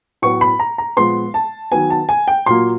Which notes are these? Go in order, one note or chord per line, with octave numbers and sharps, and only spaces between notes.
A2 F#3 B3 C#6
B5
A#5
A#5
A#2 F3 G#3 B3 C6
A5
D#3 F#3 B3 G#5
A5
G#5
G5
A#2 F#3 A#3 C6